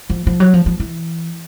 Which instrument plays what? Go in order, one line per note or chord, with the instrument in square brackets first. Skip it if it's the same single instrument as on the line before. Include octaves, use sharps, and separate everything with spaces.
[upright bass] F3
F3
F#3
F3
F3
E3